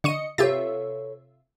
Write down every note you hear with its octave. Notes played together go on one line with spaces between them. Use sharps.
D3 D#5 C#6 C#7 D#7
C3 F4 G4 A4 B4 C#5 E5 A6